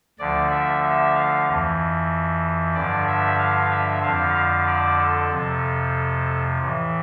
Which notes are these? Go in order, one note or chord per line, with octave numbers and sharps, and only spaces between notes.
D2 D3 F3 D5
E5
E5
F5
F2 E3
G2 D3 F3 D5
E5
F5
E5
F2 D3 F3 F5
F5
D5
A4
F2 C3 F3
A2 E3